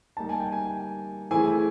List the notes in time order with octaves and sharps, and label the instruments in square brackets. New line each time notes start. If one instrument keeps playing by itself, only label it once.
[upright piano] G3 A#3 D#4 [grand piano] A5
[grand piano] G#5
G5
G#5
[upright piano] E3 A3 C4 E4 G#4 [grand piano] G#5